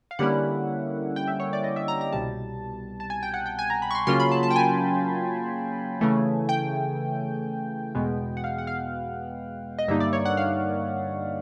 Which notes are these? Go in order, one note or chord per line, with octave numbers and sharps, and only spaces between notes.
F5
D3 G3 A#3 C#4 E4 F#5
G5
E5
C#5
D5
D#5
E5
A#5
A#5
C2 B2 G3 A5
A5
G#5
G5
F#5
G5
G#5
A#5
B5
C#6
C6
C#3 F#3 A#3 C#4 F4 C6
B5
A5
A5
G5
G#5
C#3 E3 A3
G5
E2 B2 G#3 B3
F#5
F5
F#5
F5
D#5
G2 D3 G3 A#3 D#4 E5
D5
C#5
F#5
F5